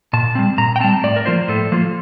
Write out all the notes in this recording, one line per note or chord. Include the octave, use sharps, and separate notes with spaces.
A#2 A5
G3 C4
A#2 A#5
G5
G3 C4 A5
A2 D5
A#4
F3 A#3 F4 C5
A2 A4
F3 A#3 F4